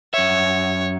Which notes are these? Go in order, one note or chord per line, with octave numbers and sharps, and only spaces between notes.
F#2 C#5 E5